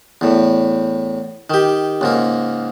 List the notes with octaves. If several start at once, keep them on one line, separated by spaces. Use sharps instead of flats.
E2 A2
D#3 G4
C#2 G#2 A#3